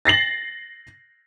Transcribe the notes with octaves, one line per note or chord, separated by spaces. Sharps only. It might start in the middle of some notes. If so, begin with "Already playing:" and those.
A6 A#6 C7 F#7